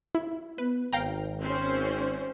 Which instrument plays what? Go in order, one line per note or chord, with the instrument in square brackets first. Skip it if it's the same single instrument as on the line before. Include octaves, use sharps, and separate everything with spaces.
[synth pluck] E4
[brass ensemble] B3 [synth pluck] B4
[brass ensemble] G#1 [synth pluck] F5 G5 A#5
[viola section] C4 C#4 C5